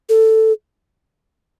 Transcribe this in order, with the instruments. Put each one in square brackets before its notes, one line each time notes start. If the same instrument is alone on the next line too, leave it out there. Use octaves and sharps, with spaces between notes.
[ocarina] A4